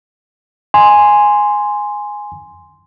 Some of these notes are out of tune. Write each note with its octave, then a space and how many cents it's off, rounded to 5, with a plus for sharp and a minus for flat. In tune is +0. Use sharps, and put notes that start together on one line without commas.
G#5 +0 C6 -5